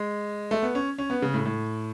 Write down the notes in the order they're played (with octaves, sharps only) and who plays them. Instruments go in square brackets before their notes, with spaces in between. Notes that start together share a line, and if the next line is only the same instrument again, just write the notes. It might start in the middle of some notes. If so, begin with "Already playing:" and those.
Already playing: [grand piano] G#3
A3
B3
C#4
C#4
B3
C#3
A2
A2